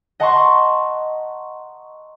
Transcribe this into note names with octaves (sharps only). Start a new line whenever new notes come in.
D#5 F#5 A5 A#5 C6 C#6